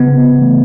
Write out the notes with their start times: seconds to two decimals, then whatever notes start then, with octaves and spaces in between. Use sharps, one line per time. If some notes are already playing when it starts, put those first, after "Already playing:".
Already playing: C#3 B3
0.39 E3 A3